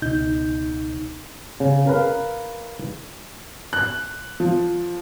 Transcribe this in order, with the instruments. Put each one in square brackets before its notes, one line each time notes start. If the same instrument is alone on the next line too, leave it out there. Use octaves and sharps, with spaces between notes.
[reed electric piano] C#2 B2 D#4 G6
[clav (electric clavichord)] C#3
A#4 B4 F5
[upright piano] F#6
F3